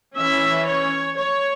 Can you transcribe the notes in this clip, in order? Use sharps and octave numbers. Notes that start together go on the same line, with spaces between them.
E3 C#4 E5
C#5
C#5